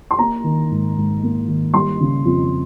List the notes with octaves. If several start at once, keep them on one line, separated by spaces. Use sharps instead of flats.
C6
A#3 A#5
D#3
G#2
G#2
A#3
D#3
G3 C6
C#3
F2